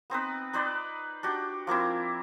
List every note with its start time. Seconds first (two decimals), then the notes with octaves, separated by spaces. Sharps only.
0.10 B3 C4 D#4 B4
0.53 D#4 B4 C5 D5
1.23 D4 F#4 G4
1.67 F3 A#3 C4 E4